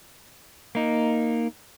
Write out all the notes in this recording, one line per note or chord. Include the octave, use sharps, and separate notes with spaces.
A#3 D#4